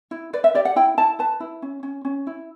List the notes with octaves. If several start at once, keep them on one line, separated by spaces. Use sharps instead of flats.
E4
B4 D5
E5
G4 D5
F#5
E4 G5
E4 A5
B4 A5
E4
C#4
C#4
C#4
E4